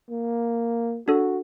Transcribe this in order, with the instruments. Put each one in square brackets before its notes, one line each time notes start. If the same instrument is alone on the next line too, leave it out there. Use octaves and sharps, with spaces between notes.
[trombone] A#3
[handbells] D4 A4 [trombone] F#4